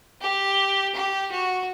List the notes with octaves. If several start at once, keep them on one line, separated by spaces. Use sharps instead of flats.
G4
G4
F#4